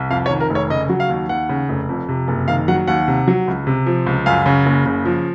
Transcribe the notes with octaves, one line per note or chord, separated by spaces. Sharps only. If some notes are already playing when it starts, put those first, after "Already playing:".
Already playing: C2
F2 F5
C#5
D#3
A#4
F1
C#5
C#3 D#5
F#3
F5
D#2
D#2 F#5
C#3
F1
F2
C3
F#1
D#3 F5
F#3 F#5
D#2 F#5
C3
F#3
C#2
C3
F3
C#2
F#2 F5
C#3
F#1
C#3
F3